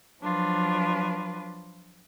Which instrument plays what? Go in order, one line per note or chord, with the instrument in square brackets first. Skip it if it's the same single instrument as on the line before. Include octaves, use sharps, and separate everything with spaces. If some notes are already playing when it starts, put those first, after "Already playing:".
[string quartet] F3 F#3 D4 F4 B4